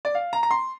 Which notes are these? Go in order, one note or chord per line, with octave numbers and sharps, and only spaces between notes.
D5
F5
A#5
A#5
C6